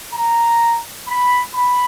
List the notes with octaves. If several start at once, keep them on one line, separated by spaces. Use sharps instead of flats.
A#5
B5
B5